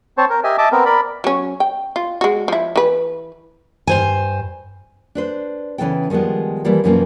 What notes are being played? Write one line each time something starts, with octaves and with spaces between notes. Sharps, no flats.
C4 C5 C#5 A5
A#4
G4 D#5 E5 G#5
D#5 E5 A5 D6
B3 C4 A#4
A#4 D5 B5
F#3 C#4
G5
F4
G#3 F#4
F3 E4
E3 B4
G2 C5 G#5
D4 B4 C5
C#3 E3 B3 A4 G5
D#3 F3 G3 G#3 B3
E3 F3 G3 A#3
F#2 B2 E3 F3 A#3 C#4